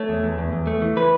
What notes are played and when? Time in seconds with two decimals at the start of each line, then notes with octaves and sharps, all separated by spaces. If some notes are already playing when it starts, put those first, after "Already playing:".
Already playing: A3 C#5
0.09 E2
0.23 E2
0.38 E2
0.52 E2
0.67 A3
0.82 E3
0.97 E3 B4